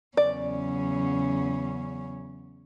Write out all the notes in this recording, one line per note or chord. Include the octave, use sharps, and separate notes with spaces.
E2 C#3 F#3 C#4 D5